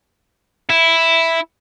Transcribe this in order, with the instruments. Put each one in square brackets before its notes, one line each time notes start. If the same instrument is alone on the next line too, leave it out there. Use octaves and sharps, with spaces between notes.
[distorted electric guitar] E4